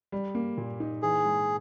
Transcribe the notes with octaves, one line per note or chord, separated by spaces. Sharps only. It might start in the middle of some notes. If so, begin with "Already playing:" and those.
G3
A#3
A#2
D#4
E3 G#4
G#3